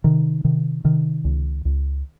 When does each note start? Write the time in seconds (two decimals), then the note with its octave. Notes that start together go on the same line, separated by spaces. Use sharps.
0.04 C3 D#3
0.44 C3 D#3
0.84 C3 D#3
1.24 C#2
1.65 C#2